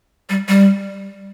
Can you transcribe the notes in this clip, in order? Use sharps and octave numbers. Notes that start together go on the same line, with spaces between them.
G3
G3